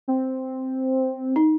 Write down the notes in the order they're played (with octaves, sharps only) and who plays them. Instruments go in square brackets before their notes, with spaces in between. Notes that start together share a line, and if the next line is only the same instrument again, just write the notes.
[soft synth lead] C4
[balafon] D#4